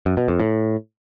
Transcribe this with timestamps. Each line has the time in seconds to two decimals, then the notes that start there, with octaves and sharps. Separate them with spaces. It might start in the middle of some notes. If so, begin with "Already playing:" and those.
0.06 F#2
0.17 B2
0.28 F2
0.40 A2